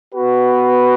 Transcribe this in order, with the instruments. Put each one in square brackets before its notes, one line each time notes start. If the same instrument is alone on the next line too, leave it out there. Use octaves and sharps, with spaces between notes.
[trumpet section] B3 F#4 B4